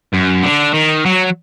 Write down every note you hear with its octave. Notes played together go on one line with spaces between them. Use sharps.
F#2
D3
D#3
F#3